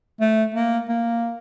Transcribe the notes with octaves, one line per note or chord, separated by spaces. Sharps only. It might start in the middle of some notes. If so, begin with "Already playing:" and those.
A3
A#3
A#3